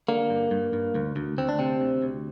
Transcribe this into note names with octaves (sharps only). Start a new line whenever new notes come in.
D3 A#3
G2
G2
G2
D2
D2
D2 C4
D4
C3 C4
D2
D2